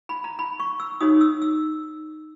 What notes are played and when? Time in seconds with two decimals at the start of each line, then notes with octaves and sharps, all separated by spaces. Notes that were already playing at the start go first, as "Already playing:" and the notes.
0.09 B5
0.24 A#5
0.39 B5
0.60 C#6
0.80 E6
1.01 D#4 F#4 C#5 D#6
1.21 E6
1.42 E6